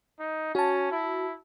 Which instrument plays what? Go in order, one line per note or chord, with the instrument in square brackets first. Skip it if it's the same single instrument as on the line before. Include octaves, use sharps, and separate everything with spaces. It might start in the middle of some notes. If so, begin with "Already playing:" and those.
[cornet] D#4
[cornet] C#4 [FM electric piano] F#4 A5
[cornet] E4